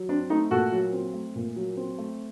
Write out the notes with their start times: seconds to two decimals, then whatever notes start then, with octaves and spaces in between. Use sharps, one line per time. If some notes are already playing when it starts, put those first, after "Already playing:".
Already playing: F#3
0.09 C4 D4
0.30 A3 D#4
0.51 A#2 F#4 A4
0.72 F#3
0.93 C4
1.13 A3
1.35 A#2
1.56 F#3
1.77 C4
1.98 A3